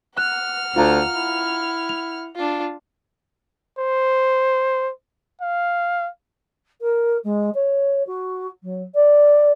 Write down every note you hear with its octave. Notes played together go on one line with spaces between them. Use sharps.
F#5 F6 F#6
D2 F4 F5 A#5
E4
F7
D4 F4
C5
F5
A#4
G#3
C#5
F#4
F#3
D5